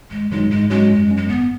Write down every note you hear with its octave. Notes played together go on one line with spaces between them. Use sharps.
G#1 G#3
F#2 D#3 F#3 G#3 D#4
G#2 G#3
F#3 G#3 C#4 F#4
F#2
F#3 C#4
G#3
G#1 B3